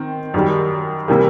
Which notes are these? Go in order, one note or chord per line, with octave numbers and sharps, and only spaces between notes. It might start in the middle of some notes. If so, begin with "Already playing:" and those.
Already playing: D#3 C4
F#2 D#3 G3
C3 E3 G3 A#3